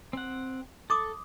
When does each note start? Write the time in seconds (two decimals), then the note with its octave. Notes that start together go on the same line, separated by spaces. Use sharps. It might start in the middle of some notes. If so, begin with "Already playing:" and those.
0.13 C4 F#5
0.90 A4 C6 D6 D#6